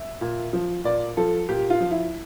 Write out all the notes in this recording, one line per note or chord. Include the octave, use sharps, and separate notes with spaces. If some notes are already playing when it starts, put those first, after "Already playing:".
Already playing: E5
A#2
F3
A#2 D5
F3 A4
A#2 G4
F4
F3
E4